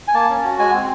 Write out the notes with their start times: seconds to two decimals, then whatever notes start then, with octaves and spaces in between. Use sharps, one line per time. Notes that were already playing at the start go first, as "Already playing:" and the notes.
0.08 G#5
0.14 A#3 A5
0.30 C#4
0.44 F#4
0.59 G#3 G#5
0.73 C4